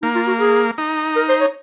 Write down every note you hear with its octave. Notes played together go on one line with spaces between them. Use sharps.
A#3 D#4
F4
F#4
G#4
D#4
A#4
C5
C#5